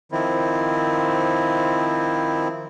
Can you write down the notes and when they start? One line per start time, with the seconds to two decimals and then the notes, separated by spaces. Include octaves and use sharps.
0.12 D#3 F3 C4 E4